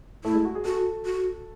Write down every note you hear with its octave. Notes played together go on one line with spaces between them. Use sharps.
A3 E4
G#3
F#4
G#4
F#4 A4
F#4